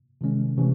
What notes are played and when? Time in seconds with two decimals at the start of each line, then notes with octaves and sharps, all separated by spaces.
0.21 C3 D#3 G#3 C#4
0.58 C3 E3 A3 C#4